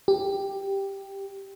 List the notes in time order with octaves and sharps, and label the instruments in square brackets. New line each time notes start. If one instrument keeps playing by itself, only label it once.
[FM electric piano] G4